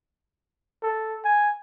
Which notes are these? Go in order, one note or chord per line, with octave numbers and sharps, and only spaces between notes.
A4
G#5